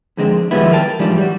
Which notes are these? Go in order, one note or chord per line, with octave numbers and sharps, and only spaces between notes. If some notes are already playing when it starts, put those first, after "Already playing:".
F2 D3 G#3 C4
D#3 F3 G3 G#3 B3 E4
A#4 F5 G5 A5
G#2 E3 F3 G3 D4
G3 F#4